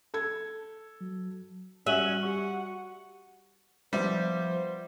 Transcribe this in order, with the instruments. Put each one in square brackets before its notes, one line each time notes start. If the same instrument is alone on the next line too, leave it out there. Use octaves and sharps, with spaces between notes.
[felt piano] A4 G#6
[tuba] F#3
[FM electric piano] G3 F#4 [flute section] C#4 [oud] E5 [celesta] F#6 D#7 F#7
[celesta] G4 C#6 [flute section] F#5
[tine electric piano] F3 F4 [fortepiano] G3 [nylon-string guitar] B3 E5 [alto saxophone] C5